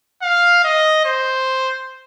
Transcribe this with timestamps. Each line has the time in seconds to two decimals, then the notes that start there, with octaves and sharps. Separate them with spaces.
0.22 F5
0.64 D#5
1.05 C5